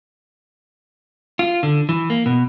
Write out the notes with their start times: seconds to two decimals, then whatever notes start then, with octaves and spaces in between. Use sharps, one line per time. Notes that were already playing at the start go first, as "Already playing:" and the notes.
1.39 F4
1.63 D3
1.89 E3
2.10 A#3
2.26 B2